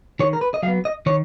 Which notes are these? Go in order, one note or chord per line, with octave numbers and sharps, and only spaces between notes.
D#3 C#5
A#4
B4
D#5
F#3 F5
B3
D#5
D#3 C#5